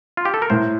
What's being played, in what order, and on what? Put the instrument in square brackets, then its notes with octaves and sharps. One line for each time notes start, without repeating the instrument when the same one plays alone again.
[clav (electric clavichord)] F4
G4
A4
A#4
[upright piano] A2 [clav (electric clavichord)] C5